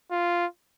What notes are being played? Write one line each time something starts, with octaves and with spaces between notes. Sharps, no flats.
F4